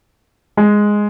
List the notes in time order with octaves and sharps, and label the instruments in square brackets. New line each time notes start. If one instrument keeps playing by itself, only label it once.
[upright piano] G#3